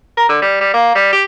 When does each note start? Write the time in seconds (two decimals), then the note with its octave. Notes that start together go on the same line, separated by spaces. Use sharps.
0.17 A#4
0.29 D3
0.42 G3
0.61 G3
0.74 A#3
0.95 G3
1.13 G4